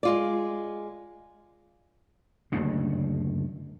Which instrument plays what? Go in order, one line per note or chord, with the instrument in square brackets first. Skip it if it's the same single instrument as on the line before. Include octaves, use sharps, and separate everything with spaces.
[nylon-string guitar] G#3 F4 D5
[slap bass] F#1 D2 G2 C#3